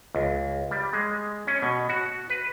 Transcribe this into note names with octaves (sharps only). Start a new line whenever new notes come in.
C#2
G3
G#3
C#4
B2
F#4
B4